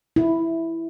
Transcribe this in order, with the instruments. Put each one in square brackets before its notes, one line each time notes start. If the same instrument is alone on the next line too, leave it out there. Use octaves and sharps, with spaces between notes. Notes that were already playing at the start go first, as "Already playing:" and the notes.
[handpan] E4